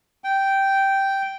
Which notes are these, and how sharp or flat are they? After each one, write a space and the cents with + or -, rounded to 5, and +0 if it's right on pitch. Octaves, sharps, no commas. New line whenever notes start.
G5 -5